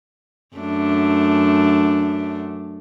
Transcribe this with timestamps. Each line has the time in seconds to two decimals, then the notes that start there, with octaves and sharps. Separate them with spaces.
0.56 F#2 A3 D4